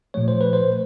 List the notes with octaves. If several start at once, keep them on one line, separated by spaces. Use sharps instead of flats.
A#2 F3 A3 C#5
C5
B4
C5